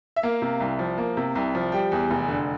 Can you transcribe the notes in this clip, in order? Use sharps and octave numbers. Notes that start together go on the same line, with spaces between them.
E5
A#3 F5
C3
C2
F3
A#3
C3
C2
F3
G3 G5
E2
F1
D3